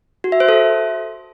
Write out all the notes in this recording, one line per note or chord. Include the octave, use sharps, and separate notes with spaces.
F#4
E5
C5
A4